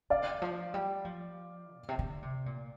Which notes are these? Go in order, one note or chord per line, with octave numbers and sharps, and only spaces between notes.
D3 D5 F5
F3
G3
F3
A#2
C3
D3
C3
A#2